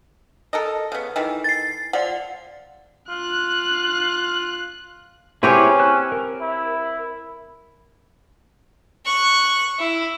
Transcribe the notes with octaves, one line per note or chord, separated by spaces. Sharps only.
A4 A#4 D#5
C#3 B3
D#3 E3 A3
A6 C7
F3 D5 F#5
F4 F#6
C4 C#4 E4 G4 G#4 B4 C#5
E6 F#6
A#4
E4
C#6 F#6
E4